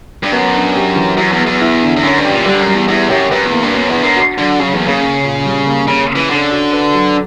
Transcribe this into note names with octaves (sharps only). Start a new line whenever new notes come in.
G2
F#2 B3
D4
G4
E3
F#2 F#3
E2
B3
E2
E4
D3
E2
F#2 C#4
G2
G4
A#2
E3
D3 G3
G2
F#2
G3
E2
E2 E4
F#2 G4
F#2 B4
E2
A#3
G2
F#2 B3
E2
D4
F#2
F#4
D3 F#3
C#3 F#3
E2
A#3
C#3
C#4
A#2
G3
A#3
C#3 C#4
C#3
E3
D3 C#4
F#4
B4
F#3